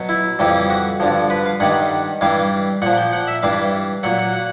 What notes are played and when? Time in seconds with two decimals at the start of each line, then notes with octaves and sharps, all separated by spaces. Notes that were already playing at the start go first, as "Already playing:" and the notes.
Already playing: B2 F#3
0.09 E4
0.39 F2 C#3 E3 G3
0.70 F#4
1.00 G2 D3 F3
1.30 B4
1.46 F5
1.60 G2 D#3 G3 F#5
2.21 G2 E3 G3 F5
2.82 A#2 F3 F#5
2.97 G5
3.13 F#5
3.28 E5
3.43 G2 E3 G3 F5
4.03 A#2 F#3 F#5
4.18 F#5
4.33 F#5